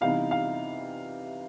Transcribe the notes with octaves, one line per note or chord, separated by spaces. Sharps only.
C3 E3 G3 B3 D#4 F5
F5